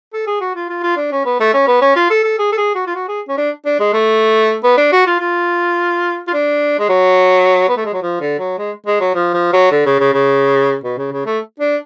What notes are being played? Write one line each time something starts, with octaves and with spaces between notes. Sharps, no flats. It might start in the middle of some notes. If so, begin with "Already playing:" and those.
A4
G#4
F#4
F4
F4
F4
D4
C#4
B3
A3
C#4
B3
C#4
F4
A4
A4
G#4
A4
G#4
F#4
F4
F#4
G#4
C#4
D4
D4
G#3
A3
B3
D4
F#4
F4
F4
F4
D4
G#3
F#3
B3
A3
G#3
F#3
F3
D3
F#3
G#3
G#3
F#3
F3
F3
F#3
D3
C#3
C#3
C#3
B2
C#3
C#3
A3
D4